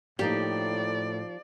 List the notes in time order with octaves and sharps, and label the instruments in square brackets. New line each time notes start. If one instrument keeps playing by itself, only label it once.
[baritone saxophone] A2 [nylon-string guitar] F3 A#3 D#4 [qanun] G4 [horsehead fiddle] D5